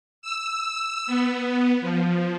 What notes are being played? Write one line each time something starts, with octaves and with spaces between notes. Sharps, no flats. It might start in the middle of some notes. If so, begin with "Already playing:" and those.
E6
B3
F3